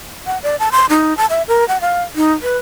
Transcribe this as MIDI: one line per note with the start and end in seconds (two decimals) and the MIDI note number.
0.26 0.38 78
0.43 0.56 74
0.59 0.69 81
0.72 0.86 84
0.90 1.16 63
1.17 1.26 81
1.30 1.43 76
1.48 1.67 70
1.68 1.78 78
1.81 2.03 77
2.15 2.32 63
2.43 2.58 71